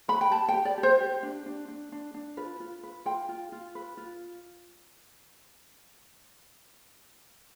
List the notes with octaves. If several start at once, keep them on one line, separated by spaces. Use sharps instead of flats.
B4 B5
G5
G4 A5
G5
G4
D5
G4
C5
G4
D4
D4
D4
D4
D4
F4 B4
F4
B4
F4 G5
F4
F4
B4
F4